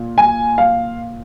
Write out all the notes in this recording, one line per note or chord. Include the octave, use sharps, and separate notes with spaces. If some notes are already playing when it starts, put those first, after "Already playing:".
Already playing: A#2
G#5
F5